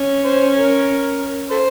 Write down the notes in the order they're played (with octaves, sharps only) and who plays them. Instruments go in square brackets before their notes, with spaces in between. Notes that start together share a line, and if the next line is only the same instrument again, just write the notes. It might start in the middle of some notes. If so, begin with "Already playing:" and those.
Already playing: [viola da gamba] C#4
[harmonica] C5
A#4
A4 C5